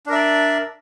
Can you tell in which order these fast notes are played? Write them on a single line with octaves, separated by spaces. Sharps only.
D4 A#4 E5 D5